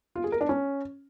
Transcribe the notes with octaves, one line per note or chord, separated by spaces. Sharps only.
F4
G#4
A#4
D4
C#4